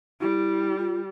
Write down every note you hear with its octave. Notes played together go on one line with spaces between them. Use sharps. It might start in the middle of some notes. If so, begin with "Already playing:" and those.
G3 E4
F4